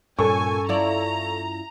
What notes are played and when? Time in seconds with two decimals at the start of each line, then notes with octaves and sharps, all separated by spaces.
0.19 G2 A#2 C#4 A4 G#5 C#6
0.69 E4 F4 D5 A#5